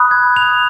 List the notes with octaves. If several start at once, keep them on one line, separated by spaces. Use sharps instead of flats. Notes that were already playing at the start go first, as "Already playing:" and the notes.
Already playing: B5 D#6 F#6
G#6
F7